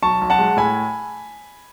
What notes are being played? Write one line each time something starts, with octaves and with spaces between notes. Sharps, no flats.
B1 A5 C#6
B1
F#5 A5
G#3
A2 G#5 B5